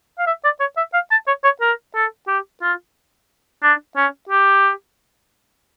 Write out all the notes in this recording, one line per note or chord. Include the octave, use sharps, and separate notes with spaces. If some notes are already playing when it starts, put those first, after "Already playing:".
F5
E5
D5
C#5
E5
F5
A5
C#5
C#5
A#4
A4
G4
F4
D4
C#4
G4